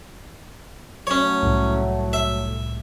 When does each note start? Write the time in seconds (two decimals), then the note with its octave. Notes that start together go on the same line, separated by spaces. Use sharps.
1.07 F#3 A3 C#4 C#5
1.42 C2 A2
2.13 E5